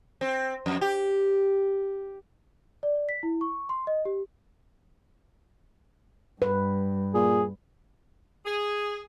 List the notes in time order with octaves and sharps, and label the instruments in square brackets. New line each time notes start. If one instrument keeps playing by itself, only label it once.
[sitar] C4
F2
G4
[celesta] D5
D5
B6
E4
C#6
C6
D#5
G4
[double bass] G2 [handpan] B4
[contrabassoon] A#2 [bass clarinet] G#4
[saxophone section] G#4